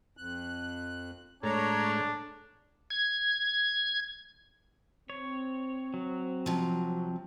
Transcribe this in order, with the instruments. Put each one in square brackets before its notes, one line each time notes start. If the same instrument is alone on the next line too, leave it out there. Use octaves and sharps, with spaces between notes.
[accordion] F2 F#6
[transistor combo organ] A2 G#3 A3 [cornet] D4 [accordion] C#5 A#5
[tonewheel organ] G#6
[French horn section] C4 [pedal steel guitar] C#5
[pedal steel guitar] F#3
[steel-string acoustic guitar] C3 F3